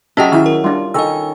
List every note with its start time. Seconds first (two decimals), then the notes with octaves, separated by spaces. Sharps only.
0.17 F#3 C#4 G4 G#4 D#5 E5 G5 A5
0.32 D#3 C#4 E4 F6
0.46 A#4
0.64 G3 D4 F4
0.94 D#3 C#4 A4 D#5 E6